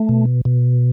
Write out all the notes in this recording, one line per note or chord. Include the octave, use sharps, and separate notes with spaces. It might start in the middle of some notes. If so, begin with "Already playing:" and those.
Already playing: A3
B2
B2